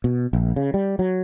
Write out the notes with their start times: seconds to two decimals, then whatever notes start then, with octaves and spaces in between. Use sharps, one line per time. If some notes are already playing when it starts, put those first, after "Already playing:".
0.04 B2
0.33 A#1
0.56 C#3
0.74 G3
0.99 F#3